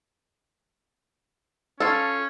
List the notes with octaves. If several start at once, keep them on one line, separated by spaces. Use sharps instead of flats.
C#4 F4 A4